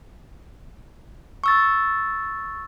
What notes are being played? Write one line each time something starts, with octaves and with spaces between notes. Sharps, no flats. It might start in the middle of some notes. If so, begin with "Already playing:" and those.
C#6 E6 A6